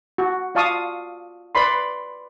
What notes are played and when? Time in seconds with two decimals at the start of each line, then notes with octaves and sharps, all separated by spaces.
0.18 F#4
0.55 F4 D5 F5 A5 C#6 D#6
1.55 B4 D5 B5 C6